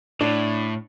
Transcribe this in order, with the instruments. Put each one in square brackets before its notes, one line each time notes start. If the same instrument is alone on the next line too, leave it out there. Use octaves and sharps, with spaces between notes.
[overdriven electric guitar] A2 [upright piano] D4